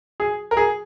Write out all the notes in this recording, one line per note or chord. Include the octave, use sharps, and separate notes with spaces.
G#4
A#4
G#4